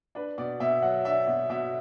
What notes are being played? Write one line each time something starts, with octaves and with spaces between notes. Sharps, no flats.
D4 B4
B2 D5
B2 E5
F#3 F#5
D4 E5
B2
B2 E5